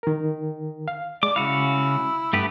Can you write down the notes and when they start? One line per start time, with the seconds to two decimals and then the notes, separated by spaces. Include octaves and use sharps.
0.03 D#3 A#4
0.88 F5
1.23 G#3 D5 D6
1.36 C#3 E4 F#4 F5
2.33 G2 A3 B3 G4 B4